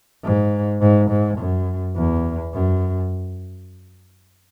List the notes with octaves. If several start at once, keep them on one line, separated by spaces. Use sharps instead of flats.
G#2
G#2
G#2
F#2
E2
F#2